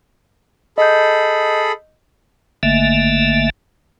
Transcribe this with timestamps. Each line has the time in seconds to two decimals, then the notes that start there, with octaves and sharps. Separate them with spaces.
0.78 G#4 A4 D#5 B5 G6
2.63 G#1 D3 A3 A#3 E5